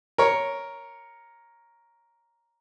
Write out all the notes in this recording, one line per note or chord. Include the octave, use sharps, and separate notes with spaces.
A#4 C#5